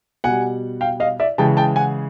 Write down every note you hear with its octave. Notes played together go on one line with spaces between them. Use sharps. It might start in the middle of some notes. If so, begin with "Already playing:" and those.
B2 G3 F#5 G#5
F5 G5
D#5 F5
D5 E5
C#3 E3 G#3 G5 A5
G5 A5
F#5 G#5